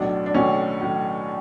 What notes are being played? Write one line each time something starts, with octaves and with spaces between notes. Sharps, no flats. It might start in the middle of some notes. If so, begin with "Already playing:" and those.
Already playing: B1 A2 F#3 D4
D4
B1 A2 F#3 C#4
A2 F#3